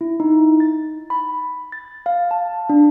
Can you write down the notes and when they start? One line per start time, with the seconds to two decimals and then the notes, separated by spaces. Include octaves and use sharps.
0.01 E4
0.20 D#4
0.60 A6
1.10 B5
1.72 A6
2.06 F5
2.31 A5
2.70 D4